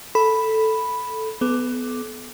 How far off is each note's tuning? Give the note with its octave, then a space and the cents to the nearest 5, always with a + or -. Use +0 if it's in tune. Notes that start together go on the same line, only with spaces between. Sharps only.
A4 +0 B5 +0
B3 +15 A4 -35 D6 +0